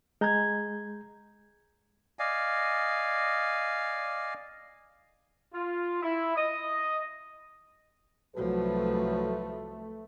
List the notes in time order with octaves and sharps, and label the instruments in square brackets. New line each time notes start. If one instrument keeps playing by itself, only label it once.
[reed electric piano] G#3 G6 [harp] A#5 G#6
[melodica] D5 D#5 F5 G#5
[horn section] F4
E4
D#5
[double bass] C2 F3 [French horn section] F#3 F#4 [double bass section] A3 [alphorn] B4